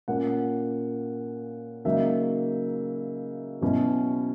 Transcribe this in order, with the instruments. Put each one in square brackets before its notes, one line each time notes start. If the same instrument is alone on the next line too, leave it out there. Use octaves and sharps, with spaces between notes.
[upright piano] A#2 A#3 C#4 F#5
C#3 F#3 A#3 D#4 E5
B2 F#3 C#4 E4